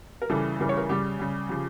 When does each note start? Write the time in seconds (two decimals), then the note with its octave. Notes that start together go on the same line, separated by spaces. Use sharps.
0.22 A#4
0.30 C#3 E3 G3 A4
0.60 C#3 E3 G3 A#4
0.69 C#5
0.77 A#4
0.89 C#3 G3 G4
1.19 C#3 G3
1.49 C#3 F3 G4